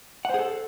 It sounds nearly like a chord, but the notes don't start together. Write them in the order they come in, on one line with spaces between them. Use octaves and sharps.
F#5 C5 G#4 A4